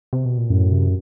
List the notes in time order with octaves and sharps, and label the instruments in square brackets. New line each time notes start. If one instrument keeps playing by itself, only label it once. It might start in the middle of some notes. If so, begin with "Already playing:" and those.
[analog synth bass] C3
B2
A#2
[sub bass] F#2 [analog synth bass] A2
[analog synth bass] C3